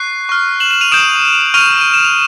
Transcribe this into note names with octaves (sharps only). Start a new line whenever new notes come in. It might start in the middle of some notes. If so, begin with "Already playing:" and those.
Already playing: C#6 F#6 C7
C#6 F6
E7 F#7
E7 F#7
D#7 F7
D#6 G6 D7 E7
C#6 F6 D#7 F7
D#7
E7
F7